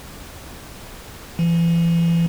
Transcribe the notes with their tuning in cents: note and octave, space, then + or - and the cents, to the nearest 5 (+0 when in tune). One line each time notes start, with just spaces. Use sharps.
E3 +35